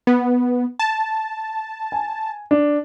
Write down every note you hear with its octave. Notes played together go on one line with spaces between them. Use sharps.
B3
A5
G#5
D4